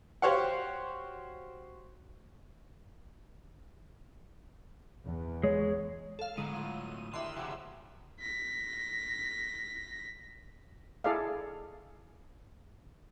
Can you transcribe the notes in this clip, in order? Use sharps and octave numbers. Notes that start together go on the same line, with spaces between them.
F#4 G4 C5 C#5 F5 F#5
E2
G#3 C#5
A4 F5
A2 D3 F#3 G#3 D#5 A#5 C#6 D#7
F4
D#3 D4 E4 G4 E5 C6
C#3 F3 E4 F#4 G4
A#6 B6
E4 G#4 A4 D5 D#5 F5